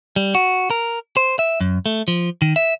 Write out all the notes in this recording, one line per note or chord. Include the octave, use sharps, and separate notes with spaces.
G3
F#4
A#4
C5
E5
F#2
A3
F3
D#3
E5